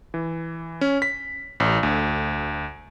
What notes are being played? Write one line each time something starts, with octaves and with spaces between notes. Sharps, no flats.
E3
C#4
B6
A1
D2